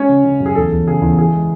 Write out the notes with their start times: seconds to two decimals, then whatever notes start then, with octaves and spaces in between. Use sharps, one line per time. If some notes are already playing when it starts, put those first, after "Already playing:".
Already playing: G#3 C#4 C#5
0.09 C#3
0.25 C#3
0.40 F#2
0.46 G#4
0.55 E2 A4
0.72 E2
0.87 C#3 G#4
1.02 E2
1.18 E3 G#4
1.34 G#3